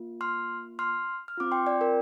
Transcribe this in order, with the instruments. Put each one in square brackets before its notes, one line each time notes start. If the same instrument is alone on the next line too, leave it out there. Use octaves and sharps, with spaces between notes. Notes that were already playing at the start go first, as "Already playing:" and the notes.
Already playing: [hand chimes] A#3 F4
C6 F6
C6 F6
F6
C4 F4 D6
G5 C6
D5 G5
A#4